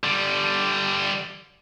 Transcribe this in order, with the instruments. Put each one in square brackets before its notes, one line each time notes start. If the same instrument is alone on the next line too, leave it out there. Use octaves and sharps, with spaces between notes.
[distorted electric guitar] D3 G3